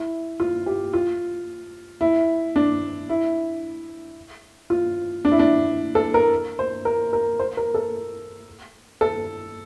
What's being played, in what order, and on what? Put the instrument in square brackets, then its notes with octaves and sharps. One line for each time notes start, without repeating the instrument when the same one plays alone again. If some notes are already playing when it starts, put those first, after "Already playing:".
Already playing: [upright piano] E4
F4
G4
F4
E4
D4
E4
F4
D4
E4
D4
A4
A#4
C5
A#4
A#4
C5
A#4
A4
A4